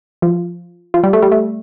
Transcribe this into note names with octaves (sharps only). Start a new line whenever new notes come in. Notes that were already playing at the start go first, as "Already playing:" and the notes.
F3
F3
G3
A3
G3
A3